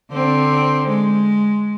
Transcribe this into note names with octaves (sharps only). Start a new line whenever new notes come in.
D3 C4
G#3